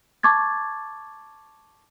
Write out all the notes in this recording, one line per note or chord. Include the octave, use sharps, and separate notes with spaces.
A5 C#6 D6 G#6 A6